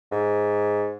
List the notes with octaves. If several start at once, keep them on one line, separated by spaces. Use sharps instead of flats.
G#2